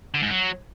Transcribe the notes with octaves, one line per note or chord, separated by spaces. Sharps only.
D3
G#2
F#3